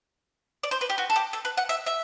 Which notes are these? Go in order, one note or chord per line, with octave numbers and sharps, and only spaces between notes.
D5
C5
B4
G4
F#4
A4
G4
A4
B4
F#5
E5
E5